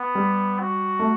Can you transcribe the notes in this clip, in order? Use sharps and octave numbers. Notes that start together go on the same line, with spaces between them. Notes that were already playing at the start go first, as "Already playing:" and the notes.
Already playing: B3
G3
F#4
A3